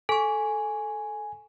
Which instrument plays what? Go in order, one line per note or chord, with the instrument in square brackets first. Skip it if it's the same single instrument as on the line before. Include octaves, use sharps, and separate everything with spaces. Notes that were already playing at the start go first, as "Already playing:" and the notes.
[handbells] A4 C#6 [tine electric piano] G#5